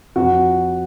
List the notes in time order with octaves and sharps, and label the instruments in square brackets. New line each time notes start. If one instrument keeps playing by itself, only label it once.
[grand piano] F2 F#4